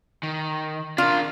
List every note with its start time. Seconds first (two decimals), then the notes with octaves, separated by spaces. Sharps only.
0.23 D#3
0.98 D4 F4 A#4